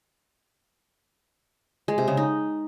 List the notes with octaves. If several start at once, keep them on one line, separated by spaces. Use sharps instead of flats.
G#3
C3
C#3
D#4